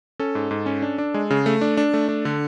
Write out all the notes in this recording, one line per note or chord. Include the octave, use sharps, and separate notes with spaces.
C#4 A4
G#2
G#2
C#4
D4
D4
G#3
C#3
A3
D4
D4
A3
D4
D3